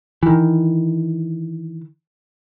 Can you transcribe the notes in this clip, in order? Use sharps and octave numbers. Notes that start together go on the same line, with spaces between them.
D#3 E3